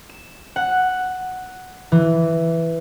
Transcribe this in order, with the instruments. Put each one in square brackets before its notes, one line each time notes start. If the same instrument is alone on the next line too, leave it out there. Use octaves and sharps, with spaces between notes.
[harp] E7
F#5
E3